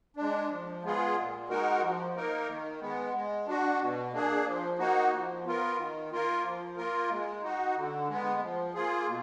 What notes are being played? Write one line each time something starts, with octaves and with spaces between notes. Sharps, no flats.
G#3 D4
F3
G#3 B3 F4 G#4
A#2
G#3 D#4 F#4 A#4
F3
A#3 D#4 A#4
D#3
G#3 B3
G#3
D4 F#4
B2
A#3 D4 G#4
F3
A#3 D#4 F#4
F3
B3 F4 A#4
D#3
A#3 F4 A#4
F3
A#3 F4 A#4
G#3
D#4 F#4
D3
G#3 B3
F3
A#3 F4 G#4
B2